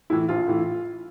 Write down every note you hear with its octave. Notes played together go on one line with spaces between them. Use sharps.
A2 E3 E4
A#1 F4
A2 E3